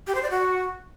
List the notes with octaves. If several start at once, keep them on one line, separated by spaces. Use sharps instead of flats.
G4
C5
D5
F#4